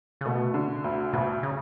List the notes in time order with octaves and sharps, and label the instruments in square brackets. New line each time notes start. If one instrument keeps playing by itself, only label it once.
[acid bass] C#3
[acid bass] B2 [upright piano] A3
[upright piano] D3
D2
[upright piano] D2 [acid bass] B2
[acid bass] C#3